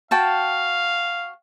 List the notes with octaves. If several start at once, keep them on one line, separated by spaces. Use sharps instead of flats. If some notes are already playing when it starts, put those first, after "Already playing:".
F#4 F5 G5 A5